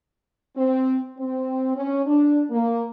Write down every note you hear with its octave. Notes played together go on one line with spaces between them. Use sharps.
C4
C4
C#4
D4
A#3